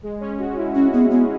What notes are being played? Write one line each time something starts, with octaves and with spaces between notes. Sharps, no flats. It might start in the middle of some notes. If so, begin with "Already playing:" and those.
G#3
C#4
F#4
E4
C#4 F#4
B3 G#4
B3 F#4